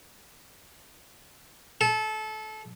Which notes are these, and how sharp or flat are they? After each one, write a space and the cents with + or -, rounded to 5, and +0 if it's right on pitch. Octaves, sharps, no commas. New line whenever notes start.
A4 -25